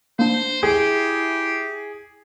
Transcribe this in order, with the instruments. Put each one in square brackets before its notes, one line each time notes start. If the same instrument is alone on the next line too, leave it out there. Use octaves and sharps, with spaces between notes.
[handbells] A#3 D4 [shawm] C5
[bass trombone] E4 [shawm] G4 [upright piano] G#4